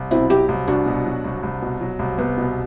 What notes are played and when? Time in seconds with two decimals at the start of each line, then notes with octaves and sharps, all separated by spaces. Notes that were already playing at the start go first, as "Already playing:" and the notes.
Already playing: C2
0.11 B2 C4 E4
0.30 F#3 E4 G4
0.49 C2
0.67 C2 D4 F#4
0.86 B2
1.05 F#3
1.24 C2
1.43 C2
1.62 B2
1.81 F#3
1.99 C2
2.18 C2 B3
2.37 B2